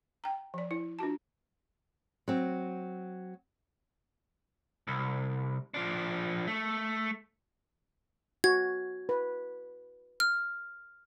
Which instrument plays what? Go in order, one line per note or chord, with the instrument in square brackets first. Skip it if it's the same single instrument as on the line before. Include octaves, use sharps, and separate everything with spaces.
[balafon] G5 A#5
F3 D5
E4
D4 F4 F#4 A5
[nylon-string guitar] F#3 C4
[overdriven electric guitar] C2
F3 D4
A3
[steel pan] F#4 [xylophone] G#6
[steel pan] B4
[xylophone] F6